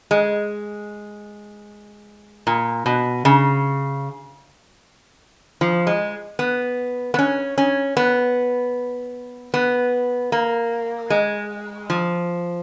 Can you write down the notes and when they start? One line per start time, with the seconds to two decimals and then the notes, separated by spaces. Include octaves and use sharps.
0.11 G#3
2.47 A#2
2.86 B2
3.25 C#3
5.61 F3
5.87 G#3
6.39 B3
7.14 B3
7.19 C#4
7.58 C#4
7.97 B3
9.54 B3
10.32 A#3
11.10 G#3
11.90 F3